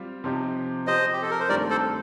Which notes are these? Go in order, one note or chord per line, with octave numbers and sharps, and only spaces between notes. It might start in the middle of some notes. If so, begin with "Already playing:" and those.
Already playing: G3 C4 F4
C3 F3 C4 D#4 G4
F3 C4 G4 C5 D#5
G4
A4
A#4
C5
G2 D#3 A3 C4 G4 A#4 D5
A4 C5